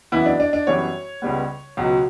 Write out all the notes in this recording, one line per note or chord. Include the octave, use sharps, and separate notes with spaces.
F#2 E3 B3 E4
D4
D4
D4
F#2 E3 G3 B3 C#5
C#2 C#3 G3 B3
C#2 B2 F#3